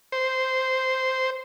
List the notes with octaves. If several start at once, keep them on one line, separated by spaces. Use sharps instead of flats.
C5